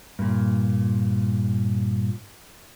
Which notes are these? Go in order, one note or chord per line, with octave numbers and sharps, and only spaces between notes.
G2 A#2